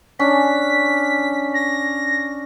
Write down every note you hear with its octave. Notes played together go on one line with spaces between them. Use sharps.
C#4 D4 B6
A#6